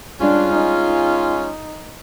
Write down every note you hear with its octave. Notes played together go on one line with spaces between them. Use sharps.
G3 G#3 C#4 D4 F4
D#4